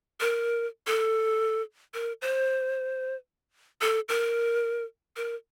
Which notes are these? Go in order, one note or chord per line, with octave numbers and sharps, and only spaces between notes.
A#4
A4
A#4
C5
A4
A#4
A#4